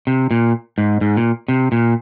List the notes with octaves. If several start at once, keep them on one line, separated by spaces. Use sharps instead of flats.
C3
A#2
G#2
G#2
A#2
C3
A#2